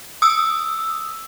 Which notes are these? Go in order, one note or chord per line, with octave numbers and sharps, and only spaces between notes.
D#6 E6